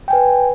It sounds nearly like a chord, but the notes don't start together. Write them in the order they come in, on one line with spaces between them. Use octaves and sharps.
G5 G#5 B4